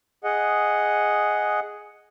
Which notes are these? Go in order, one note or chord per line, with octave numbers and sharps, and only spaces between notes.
G#4 D#5 F#5